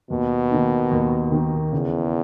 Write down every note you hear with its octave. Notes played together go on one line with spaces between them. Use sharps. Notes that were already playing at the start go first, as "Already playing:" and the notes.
D#2 B2
D#3 A#3 D#4
D#2
D#3 A#3 D#4
E2 C#3